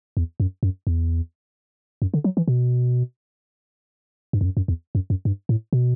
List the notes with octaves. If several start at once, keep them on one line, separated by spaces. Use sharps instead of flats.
E2
F#2
F#2
E2
F#2
D3
F#3
E3
B2
G2
E2
F#2
F#2
E2
F#2
F#2
G2
A2
B2